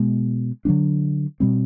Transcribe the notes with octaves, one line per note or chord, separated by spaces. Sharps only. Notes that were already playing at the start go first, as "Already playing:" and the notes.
Already playing: B2 G#3 B3
D3 F#3 B3 D4
B2 G3 C4